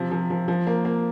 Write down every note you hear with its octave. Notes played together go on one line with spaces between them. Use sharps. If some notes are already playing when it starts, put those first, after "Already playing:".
Already playing: C3 F3
F3
F3
F3
A#3
A#3